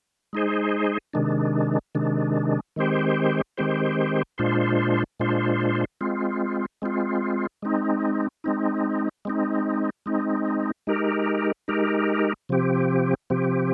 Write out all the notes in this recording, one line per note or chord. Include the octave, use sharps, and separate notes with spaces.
G#3 D#4 G#4 C5
C3 D#3 G#3 D4
C3 D#3 G#3 D4
D#3 G#3 C4 G4 C5
D#3 G#3 C4 G4 C5
A#2 G#3 D4 F4 C5
A#2 G#3 D4 F4 C5
G#3 C4 F4
G#3 C4 F4
G#3 C4 D#4
G#3 C4 D#4
G#3 C4 D#4
G#3 C4 D#4
G#3 D#4 G4 A#4
G#3 D#4 G4 A#4
C3 F3 C4 G4
C3 F3 C4 G4